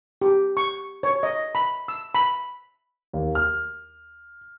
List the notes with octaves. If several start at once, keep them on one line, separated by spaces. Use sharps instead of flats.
G4
C#6
C#5
D#5
B5
E6
B5
D#2
F6